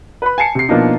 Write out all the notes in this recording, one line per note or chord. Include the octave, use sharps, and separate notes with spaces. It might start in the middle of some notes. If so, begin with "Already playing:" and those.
B4 B5
G#5 A5 C7 C#7
C3 C7
B2 F3 A#3 D4 D#4